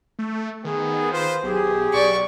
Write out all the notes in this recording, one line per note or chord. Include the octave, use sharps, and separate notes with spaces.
A3
D#3 B3 G#4
F4 B4 C5
B1 G4 G#4
B1 D5 C#6